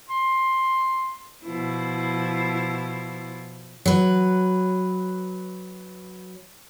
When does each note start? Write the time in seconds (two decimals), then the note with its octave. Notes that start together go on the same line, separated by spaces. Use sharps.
0.09 C6
1.45 B2 F3 E4
3.86 F#3 B4